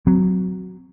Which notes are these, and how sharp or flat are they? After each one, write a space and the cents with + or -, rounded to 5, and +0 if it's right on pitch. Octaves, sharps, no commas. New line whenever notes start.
F#3 +0 C4 -10